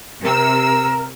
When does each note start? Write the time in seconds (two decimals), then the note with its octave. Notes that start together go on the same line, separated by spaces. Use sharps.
0.21 C3 A#4 E6